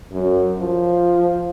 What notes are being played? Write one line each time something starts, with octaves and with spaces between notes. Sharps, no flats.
F#2
F3